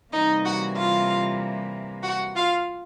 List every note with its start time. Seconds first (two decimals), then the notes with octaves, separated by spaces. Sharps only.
0.13 C3 E3 G3 A#3 D#4 D#5
0.45 F#4 F#5
0.76 F4 F5
2.03 F#4 F#5
2.36 F4 F5